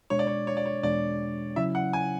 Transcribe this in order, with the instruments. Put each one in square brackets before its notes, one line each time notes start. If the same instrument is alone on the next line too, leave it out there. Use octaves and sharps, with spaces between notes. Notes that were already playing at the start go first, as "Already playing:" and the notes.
[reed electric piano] B2 G#3 D4 [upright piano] C#5
[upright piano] D5
C#5
C#5
D5
C#5
[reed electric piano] E2 B2 G#3 D4 [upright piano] D5
[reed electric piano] C#3 F#3 C#4 E4 [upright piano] E5
[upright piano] F#5
G#5